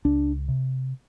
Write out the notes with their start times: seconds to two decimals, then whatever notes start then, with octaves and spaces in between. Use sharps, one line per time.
0.05 C#2 D4
0.48 C3